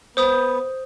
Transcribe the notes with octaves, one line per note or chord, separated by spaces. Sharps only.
B3 C5 D#6 G6